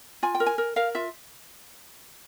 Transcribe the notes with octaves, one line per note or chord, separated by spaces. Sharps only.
F4 G#5
G5
A#4
G#5
A#4
A#4 F5
F4 E5